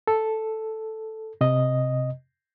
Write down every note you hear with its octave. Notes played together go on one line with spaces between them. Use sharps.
A4
C3 D#5